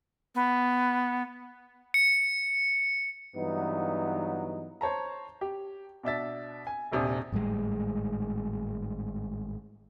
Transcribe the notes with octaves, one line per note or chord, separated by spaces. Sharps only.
B3
C#7
G2 E3 F#3 B3 D#4
C5 C#5 A5 A#5
G4
B2 D4 E5 A6
G#5
D#1 D#2 C3 D4 G#5 D#6
G#1 A2 G3 G#3